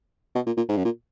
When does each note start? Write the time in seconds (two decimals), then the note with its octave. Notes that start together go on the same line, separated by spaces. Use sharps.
0.35 B2
0.47 A#2
0.57 A#2
0.69 G#2
0.77 F#2
0.85 A#2